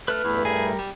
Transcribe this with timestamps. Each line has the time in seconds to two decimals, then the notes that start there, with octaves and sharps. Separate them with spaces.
0.08 A3 B4 F6
0.24 E2 G2 A3 E4
0.45 G3 G#4 A#4
0.78 G3